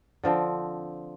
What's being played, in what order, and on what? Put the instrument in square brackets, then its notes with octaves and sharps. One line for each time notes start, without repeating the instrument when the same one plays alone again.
[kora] D3 F3 C4